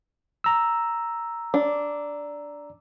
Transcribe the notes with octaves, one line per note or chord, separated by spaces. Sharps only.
A#5 E6
D4